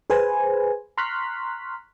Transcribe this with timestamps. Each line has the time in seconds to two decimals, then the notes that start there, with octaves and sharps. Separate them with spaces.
0.10 G#4 B4 C5 G#5
0.97 A#5 C6 C#6 F6 F#6 B6